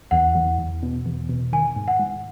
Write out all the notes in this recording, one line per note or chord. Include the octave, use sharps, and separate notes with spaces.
E2 F#5
E2
E2
B2
E2
B2
D#3 G#5
G#2
F#5
G#2